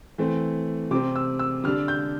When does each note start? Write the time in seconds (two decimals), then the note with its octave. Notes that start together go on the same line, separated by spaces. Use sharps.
0.18 E3 A3 C4
0.91 C3 G3 C4 D6
1.16 E6
1.39 E6
1.64 D3 G3 D4 F6
1.88 G6